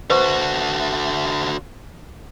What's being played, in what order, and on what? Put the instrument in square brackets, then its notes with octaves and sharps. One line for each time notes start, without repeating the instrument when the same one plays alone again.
[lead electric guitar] D3 F#4 [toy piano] B4 C5 C#6